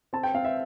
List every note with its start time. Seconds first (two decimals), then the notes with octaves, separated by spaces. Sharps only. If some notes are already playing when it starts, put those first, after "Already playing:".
0.13 C4 A5
0.23 G5
0.34 C4 F5
0.45 E5